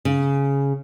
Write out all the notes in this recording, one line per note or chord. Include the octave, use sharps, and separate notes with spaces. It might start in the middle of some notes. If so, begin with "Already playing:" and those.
C#3